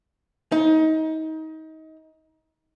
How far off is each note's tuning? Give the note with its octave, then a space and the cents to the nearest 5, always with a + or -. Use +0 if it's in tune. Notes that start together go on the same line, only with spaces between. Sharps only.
D#4 +25